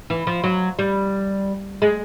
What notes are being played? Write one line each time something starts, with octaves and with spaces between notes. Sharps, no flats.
E3
F3
F#3
G3
G#3